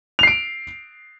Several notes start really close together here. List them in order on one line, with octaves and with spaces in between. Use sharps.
F7 C7 D7